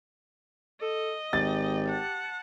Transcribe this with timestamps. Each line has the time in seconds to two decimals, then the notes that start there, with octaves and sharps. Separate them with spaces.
0.82 A4 D#5
1.33 G#1 G4 A6
1.88 F#5 A5